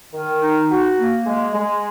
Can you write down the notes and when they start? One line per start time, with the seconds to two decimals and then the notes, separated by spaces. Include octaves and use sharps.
0.13 D#3
0.42 D#4
0.70 F#4
0.98 A#3
1.26 G#3
1.54 G#3